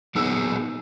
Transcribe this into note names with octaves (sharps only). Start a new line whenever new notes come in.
A#2 F#3 B3 D#4 G#4 E6